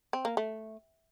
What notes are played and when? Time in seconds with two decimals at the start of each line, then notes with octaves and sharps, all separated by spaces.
0.13 C4
0.25 A#3
0.37 A3